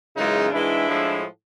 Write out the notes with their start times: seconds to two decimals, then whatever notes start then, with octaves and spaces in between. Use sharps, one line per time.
0.16 F#2 C#3 E3 G#3 D#4 F4
0.52 G#2 E3 G#3 D4 E4
0.88 A2 F3 G#3